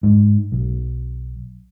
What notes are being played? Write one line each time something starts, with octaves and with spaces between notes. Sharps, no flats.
G#2
B1